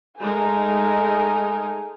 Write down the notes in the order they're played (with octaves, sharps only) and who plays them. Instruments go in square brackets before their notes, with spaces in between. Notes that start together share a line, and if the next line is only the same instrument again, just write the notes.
[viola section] G#3 D#4 A#4 [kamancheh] A3 G#5